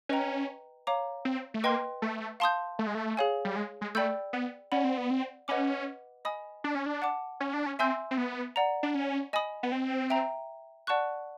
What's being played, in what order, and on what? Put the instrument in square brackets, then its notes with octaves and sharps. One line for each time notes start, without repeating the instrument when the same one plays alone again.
[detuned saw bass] C#4 [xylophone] B4 D#5 G5 A#5
[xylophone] C#5 F5 A#5 D6
[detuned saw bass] C4
A3
[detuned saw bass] A#3 [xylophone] B4 D#5 G5 C6
[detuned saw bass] A3
[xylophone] F5 A5 C6 D#6 G6
[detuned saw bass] A3
G#3
A3
[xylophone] G#4 C#5 F5 G#5
[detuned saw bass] G3
G#3
G#3
[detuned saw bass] A3 [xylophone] D5 G5 B5 E6 G6
[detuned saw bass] B3
[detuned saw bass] C#4 [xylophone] D5 F#5 B5
[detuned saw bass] C4
B3
C4
[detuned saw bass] C#4 [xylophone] B4 D#5 F#5 B5 D6
[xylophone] D#5 G#5 B5 D#6
[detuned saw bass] D4
C#4
D4
[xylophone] F#5 A5 D6
[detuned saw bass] C#4
D4
C#4
[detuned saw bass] C4 [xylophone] E5 G#5 C6 E6 G6
[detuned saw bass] C4
B3
[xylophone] D5 F#5 A#5
[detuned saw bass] D4
C#4
[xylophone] D#5 G#5 B5 D#6
[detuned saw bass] B3
C4
[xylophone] E5 G5 A#5
D5 F#5 A5 C#6 F#6